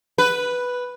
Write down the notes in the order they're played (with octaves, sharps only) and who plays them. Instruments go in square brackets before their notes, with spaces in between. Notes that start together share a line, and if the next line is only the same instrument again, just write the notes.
[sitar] B4